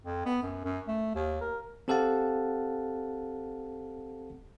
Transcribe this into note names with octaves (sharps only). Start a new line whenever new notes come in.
F2
B3
F#2
F#2
A3
D#2
A#4
C4 G4 A4 F5 F#5 A5